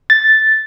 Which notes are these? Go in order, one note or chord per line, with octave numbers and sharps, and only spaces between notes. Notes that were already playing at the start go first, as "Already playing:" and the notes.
A6